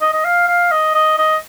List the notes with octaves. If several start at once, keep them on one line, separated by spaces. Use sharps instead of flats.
D#5
D#5
F5
F5
D#5
D#5
D#5